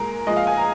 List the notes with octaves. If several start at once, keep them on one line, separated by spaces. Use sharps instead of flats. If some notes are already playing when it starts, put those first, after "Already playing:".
Already playing: A#2 G#3 A#4
A#2 F3 G#3 D#5
F5
G#5
A#5